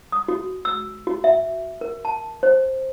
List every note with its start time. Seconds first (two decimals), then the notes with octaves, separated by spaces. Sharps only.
0.12 D#6
0.28 F#4
0.65 E6
1.07 F#4
1.24 E5
1.81 A#4
2.05 A5
2.43 C5